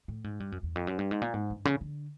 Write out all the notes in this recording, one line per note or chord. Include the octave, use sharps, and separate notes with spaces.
A2
G#2
G2
F#2
E2
F2
F#2
G2
G#2
A#2
G#2
G2
C#3
D3